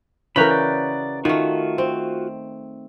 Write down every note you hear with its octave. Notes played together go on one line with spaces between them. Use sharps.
C#3 E3 F#4 A#4 A#5 B5 G6 B6
D5
D#3 A3 F4 F#4
C4